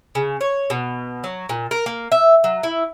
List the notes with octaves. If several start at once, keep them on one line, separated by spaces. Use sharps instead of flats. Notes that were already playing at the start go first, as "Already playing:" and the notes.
C#3
C#5
B2
F#3
A#2
A#4
A#3
E5
F#3
E4